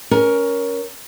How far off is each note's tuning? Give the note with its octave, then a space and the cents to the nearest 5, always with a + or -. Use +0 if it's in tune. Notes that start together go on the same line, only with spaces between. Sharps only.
C#4 +10 A#4 +15